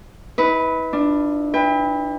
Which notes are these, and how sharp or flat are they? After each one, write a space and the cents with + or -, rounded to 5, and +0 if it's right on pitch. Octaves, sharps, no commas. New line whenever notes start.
E4 -45 B4 +0
D4 +10 F4 -15
B4 +0 E5 -25 G5 +35